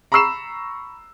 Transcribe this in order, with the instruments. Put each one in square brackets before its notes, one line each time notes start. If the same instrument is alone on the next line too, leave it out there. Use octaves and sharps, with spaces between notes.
[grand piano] A#5 B5 C#6 E6 C7 E7